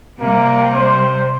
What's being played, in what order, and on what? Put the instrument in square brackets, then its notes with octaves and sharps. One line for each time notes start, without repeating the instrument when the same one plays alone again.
[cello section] C3 G3 [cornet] A#3
[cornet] C5